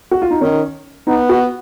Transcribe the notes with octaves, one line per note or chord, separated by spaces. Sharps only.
F#4
F4
D#4
D#3 C#4
B3 D#4
F#4